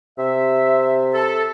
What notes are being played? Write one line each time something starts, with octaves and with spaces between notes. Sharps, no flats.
C3 E5
A4